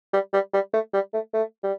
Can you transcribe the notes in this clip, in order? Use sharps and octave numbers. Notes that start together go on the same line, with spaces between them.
G3
G3
G3
A3
G3
A3
A3
G3